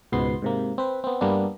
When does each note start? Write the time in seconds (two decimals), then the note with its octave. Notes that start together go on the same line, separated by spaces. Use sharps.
0.12 C#2 G#2 B2 B3 C6
0.42 G#2 C3 A#3
0.78 C4 B4
1.04 B3 C4
1.21 G2 G3 A#3 B3 D4